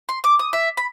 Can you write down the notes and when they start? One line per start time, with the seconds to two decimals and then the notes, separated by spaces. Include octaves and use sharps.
0.09 C6
0.24 D6
0.39 D#6
0.53 E5
0.77 B5